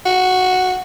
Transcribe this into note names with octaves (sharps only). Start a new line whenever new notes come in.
F#4